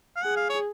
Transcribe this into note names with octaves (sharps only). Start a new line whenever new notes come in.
F5
G#4 F#5
F5
C#5